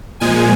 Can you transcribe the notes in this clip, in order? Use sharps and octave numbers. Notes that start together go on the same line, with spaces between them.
A#2 F3 G#3 G#5